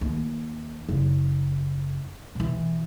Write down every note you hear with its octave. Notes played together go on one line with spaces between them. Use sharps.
D#2
F#1
B2 E3